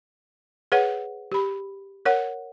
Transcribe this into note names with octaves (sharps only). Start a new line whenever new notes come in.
G#4 B4 C#5 F#5
G4 B5
A#4 C#5 F#5